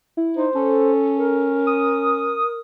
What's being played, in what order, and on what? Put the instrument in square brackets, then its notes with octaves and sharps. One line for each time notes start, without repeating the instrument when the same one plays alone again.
[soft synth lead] E4
[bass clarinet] D#4 [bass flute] C5
[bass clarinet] C#4 [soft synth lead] A4
[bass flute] A#4
[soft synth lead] D#6